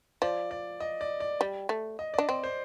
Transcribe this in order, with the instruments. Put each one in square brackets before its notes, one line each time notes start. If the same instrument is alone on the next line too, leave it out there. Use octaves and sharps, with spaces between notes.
[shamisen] F3 [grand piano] D5
[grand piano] D5
D#5
D5
D5
[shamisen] G3
A3
[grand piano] D#5
[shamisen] D4 [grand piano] D5
[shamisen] C4 [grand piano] D5
[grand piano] C5